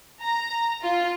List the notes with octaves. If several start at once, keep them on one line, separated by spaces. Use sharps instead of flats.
A#5
F4